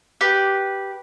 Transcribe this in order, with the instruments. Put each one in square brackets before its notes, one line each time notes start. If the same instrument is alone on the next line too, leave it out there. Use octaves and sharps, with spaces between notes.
[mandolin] G4 B4